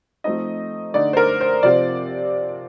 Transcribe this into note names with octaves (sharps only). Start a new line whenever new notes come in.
F3 A3 C4 D#4 D#5
D3 A3 D#4 D5
C5
A#4
C5
C3 F3 C4 F4 D5